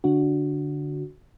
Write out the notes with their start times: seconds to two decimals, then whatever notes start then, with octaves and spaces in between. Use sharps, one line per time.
0.04 D3 D4 F#4